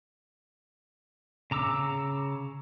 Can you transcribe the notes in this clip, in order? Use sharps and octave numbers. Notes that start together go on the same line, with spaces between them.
C#3 A#5 D6 E6